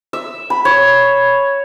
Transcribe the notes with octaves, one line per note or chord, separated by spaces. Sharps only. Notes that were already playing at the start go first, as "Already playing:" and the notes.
E5
B5
C#5